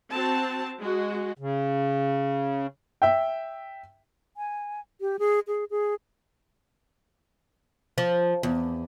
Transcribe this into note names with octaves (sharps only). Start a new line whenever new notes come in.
C4 F#4 A5
G#3 F#4
C#3
E5 G5
G#5
G4
G#4
G#4
G#4
F3
E2